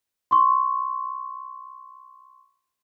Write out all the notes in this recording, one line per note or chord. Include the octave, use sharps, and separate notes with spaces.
C6 C#6